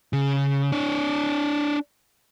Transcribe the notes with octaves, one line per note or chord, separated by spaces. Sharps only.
C#3
D4 C#5